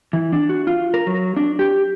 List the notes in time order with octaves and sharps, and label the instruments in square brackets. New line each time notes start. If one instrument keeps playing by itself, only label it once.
[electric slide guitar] E3
D4
F#4
F4
A#4
F#3
D4
G4